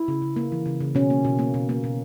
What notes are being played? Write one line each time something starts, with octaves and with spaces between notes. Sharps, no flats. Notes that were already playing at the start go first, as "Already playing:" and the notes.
Already playing: E4
C#3
C#3
A#3
E3
C#3
C#3
B2 C#4
A#3
B2
A#3
B2
A#3
B2